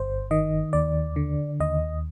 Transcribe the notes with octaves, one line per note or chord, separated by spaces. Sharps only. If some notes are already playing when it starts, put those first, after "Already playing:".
Already playing: G1 C5
D#3 D#5
D#2 D5
D3
D#2 D#5